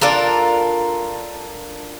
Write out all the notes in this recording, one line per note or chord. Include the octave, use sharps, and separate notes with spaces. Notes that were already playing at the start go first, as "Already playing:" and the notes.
D4 F4 A4 A#4